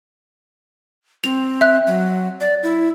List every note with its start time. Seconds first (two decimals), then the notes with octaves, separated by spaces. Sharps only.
1.24 C4 F7
1.61 E5 F#6
1.87 F#3
2.40 D5
2.63 E4